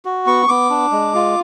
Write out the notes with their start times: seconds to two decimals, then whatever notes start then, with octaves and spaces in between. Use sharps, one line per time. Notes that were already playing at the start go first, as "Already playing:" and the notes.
0.05 F#4
0.26 B3 C#6
0.48 B3 D6
0.70 D4
0.92 G#3
1.15 F4